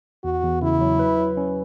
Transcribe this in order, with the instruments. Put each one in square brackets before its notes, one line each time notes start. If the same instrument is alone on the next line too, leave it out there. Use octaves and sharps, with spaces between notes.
[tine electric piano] E2 [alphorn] F#4
[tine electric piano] E2
[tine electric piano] C#3 [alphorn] E4
[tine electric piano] F#3
B4
F#3
C#4